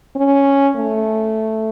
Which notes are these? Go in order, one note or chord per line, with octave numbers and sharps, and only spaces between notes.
C#4
A3